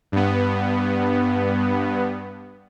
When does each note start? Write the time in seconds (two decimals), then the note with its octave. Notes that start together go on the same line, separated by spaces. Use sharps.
0.12 G2 B3